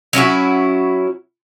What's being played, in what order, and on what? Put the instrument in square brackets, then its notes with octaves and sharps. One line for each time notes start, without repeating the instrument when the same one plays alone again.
[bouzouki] F#3 C#4 E4 F#4